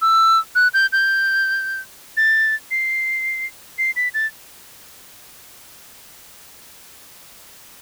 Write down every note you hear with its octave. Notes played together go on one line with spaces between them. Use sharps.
E6
F#6
G6
G6
A6
C7
C7
B6
A6